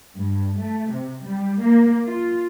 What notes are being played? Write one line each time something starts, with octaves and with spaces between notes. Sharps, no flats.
G2
A3
C3
G3
A#3
F4